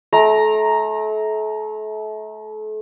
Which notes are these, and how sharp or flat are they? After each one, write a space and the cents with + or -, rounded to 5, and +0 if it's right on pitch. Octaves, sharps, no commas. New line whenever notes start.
A3 -35 A#5 +0